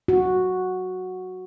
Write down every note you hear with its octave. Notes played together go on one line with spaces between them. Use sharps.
F#4